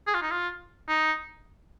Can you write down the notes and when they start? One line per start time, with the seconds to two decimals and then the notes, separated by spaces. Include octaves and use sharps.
0.07 G#4
0.14 F4
0.22 D#4
0.31 F4
0.88 D#4